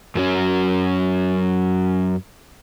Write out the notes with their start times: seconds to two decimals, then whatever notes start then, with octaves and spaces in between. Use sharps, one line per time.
0.15 F#2 F#3 C#4